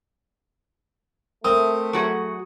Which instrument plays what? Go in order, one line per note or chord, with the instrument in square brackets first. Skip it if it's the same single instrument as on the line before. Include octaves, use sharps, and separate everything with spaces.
[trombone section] A3 [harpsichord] C4 A#4 [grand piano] D#6
[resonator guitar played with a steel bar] F#3 F#4 G#4